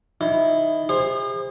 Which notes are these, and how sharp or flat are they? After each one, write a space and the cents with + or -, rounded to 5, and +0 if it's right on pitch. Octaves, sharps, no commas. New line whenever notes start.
D#3 +0 E4 +0
G#4 -40 C5 +5